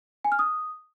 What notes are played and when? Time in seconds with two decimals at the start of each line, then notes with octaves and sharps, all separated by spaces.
0.25 G#5
0.32 F6
0.39 D#6